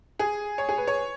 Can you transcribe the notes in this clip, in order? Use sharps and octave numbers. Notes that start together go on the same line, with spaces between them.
G#4
C#5
G#4
B4
C#5